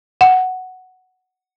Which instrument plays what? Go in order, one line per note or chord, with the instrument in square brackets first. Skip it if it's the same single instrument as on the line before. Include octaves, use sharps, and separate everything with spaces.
[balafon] F#5